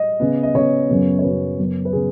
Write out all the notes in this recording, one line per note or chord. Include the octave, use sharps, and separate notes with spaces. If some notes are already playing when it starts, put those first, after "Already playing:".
Already playing: D#5
C#3 B3
D#5
C#3 B3 C#5
F#2 C#3 F#3 B3
C#5
F#2 C#3 F#3 B3 B4
F#2 C#3 B3
B4
C#3 B3 G#4